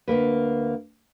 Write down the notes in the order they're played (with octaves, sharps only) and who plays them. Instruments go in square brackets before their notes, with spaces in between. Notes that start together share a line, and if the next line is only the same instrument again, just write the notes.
[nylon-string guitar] D2 A#2 A#3 B4